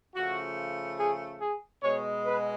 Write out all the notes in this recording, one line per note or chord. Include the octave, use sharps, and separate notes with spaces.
C#3 F3 A3 F#4
G#4
G#4
B2 G#3 C#5
B4